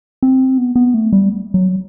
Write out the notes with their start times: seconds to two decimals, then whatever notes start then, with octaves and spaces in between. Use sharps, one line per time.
0.23 C4
0.58 B3
0.76 B3
0.94 A3
1.13 G3
1.54 F#3